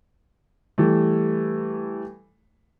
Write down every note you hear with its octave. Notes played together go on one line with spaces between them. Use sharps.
E3 G3 A3